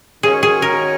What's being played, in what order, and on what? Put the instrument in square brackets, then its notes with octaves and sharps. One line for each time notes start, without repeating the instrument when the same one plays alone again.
[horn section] D#3 G#3 C#4 F#4 [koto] G#4
[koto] G#4
A#4